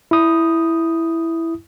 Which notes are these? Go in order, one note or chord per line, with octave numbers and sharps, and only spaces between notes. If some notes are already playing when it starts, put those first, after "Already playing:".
E4 D#6